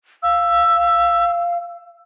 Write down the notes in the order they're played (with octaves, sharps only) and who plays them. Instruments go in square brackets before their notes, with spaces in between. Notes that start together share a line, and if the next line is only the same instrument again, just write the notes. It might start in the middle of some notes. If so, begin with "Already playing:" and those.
[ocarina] F5 [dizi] E6